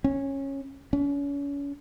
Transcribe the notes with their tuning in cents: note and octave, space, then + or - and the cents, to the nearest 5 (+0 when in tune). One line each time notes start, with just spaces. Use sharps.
C#4 -15
C#4 +35